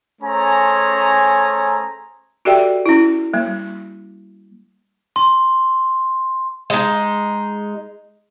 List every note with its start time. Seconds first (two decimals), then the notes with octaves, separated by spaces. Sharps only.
0.22 A3 C#4 G#4 C5 G#5 A#5
2.45 F#4 G4 A4 D5 E5 G5
2.86 C#4 E4
3.34 G3 A#3
5.16 C6
6.70 G#3 D#4